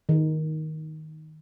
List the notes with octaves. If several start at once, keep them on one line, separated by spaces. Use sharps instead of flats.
D#3